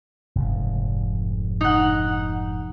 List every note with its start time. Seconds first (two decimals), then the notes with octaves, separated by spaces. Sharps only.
0.35 F1 G#2
1.61 D#4 F#5